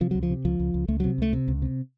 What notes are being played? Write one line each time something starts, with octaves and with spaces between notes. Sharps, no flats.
C3 F3
C#2 F#3
F3
C3
C#2 F3
C#2
C#2
C#2 A3
C3 F#3
C#2 A3
C3
C#2
C3